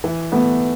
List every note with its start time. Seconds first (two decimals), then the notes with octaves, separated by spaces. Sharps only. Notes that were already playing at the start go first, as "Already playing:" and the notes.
0.04 E3
0.32 A3 B3